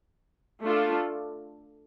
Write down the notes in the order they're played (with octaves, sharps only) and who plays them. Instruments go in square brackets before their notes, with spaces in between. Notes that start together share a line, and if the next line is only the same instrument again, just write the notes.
[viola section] A3 D4 F4 A4